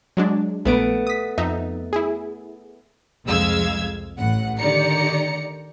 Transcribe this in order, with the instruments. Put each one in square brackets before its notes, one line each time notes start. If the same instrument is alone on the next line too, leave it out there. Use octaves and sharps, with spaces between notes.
[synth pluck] F#3 G#3 D4
[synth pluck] A#1 B4 D7 [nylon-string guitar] A3 B3
[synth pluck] D#6 B6
F2 D#4 E5
E4 G#4
[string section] C2 F2 G#3 F5 E6 G#6
A1 A2 F#5
D3 D#3 G4 D5 A#5 C#7